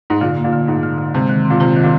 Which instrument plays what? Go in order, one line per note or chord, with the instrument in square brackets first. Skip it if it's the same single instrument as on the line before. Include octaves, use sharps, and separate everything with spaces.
[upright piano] G#2
[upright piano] A#2 [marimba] D3
[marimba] A#3
[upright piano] A#2
[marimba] D3
[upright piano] G#2 [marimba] D3
[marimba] D3
D3
[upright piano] C3 [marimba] G#3
[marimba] D#3
C4
[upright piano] A#2
[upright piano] C3 [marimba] F4
[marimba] D#3
[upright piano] A#2